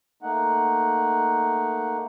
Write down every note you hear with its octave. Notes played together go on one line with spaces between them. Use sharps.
A3 A#3 D#4 F#5